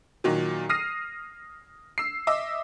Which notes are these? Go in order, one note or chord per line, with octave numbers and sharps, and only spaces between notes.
A#2 D#3 F#3
D#6 F6 A#6 C7 D#7
E6 C7
D#5 E5 D6 E6